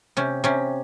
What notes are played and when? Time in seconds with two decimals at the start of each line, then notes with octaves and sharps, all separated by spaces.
0.17 C3 C#4
0.44 C3 C#4